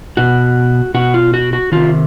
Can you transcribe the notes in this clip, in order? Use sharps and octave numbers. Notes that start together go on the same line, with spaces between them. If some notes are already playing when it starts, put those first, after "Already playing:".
B2 F#4
B2 F#4
F4
F#4
F#4
C3 D#3 F4